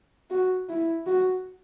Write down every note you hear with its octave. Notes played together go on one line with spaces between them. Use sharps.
F#4
E4
F#4